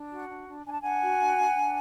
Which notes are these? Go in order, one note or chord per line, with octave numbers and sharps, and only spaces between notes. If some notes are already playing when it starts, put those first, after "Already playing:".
Already playing: D4
F#4
D4
D4
D4 G#5
A5
D4 F#5 G#5
F#4
D4
D4
D4